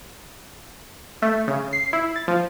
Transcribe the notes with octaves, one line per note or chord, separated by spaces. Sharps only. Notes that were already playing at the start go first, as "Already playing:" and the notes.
A3
C#3
C7
E4
A6
F3